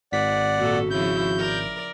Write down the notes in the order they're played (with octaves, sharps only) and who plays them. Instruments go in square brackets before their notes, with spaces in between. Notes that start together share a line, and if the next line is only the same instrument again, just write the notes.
[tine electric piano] G#1 B6 [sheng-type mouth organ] D5 F#5
[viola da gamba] A#2 A4 [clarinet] F#4
[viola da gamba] C#3 F3 E4 [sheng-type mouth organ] G6
[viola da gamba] A#4 D5